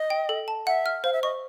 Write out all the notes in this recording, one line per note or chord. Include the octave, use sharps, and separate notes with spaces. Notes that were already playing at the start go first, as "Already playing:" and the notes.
Already playing: D#5
G5
A4
A5
E5 F#5
F6
C5 F5
E5
D#5 C#6